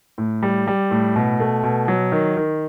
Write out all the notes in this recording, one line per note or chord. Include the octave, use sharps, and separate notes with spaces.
A2
G3
G3
A2
B2
A3
B2
F#3
D#3
D#3